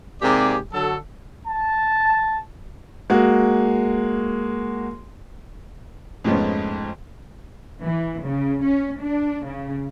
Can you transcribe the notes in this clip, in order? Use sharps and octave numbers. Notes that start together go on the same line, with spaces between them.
G#2 C3 A#3 G4 G#4 D5
D3 F#3 A4
A5
G#3 A#3 F#4
F2 G#2 G#3 A3 B3 C#4
E3
C#3
C#4
D4
C#3